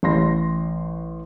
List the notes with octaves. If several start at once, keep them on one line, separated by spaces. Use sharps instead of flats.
A1 C6 A#6